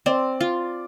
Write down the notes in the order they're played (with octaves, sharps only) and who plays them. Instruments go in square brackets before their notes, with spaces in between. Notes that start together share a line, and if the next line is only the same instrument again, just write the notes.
[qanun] C4 [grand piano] D5
[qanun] F4